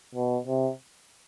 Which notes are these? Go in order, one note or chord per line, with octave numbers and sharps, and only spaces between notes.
B2
C3